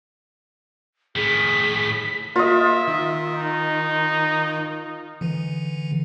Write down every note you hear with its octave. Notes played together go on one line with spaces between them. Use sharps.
A2 D#3 G#4 B6
A#3 F4 D#5 E5
D#3
D#4
D3 E3